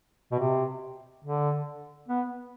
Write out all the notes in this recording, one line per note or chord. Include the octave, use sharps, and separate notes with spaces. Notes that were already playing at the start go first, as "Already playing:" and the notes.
B2
C3
D3
B3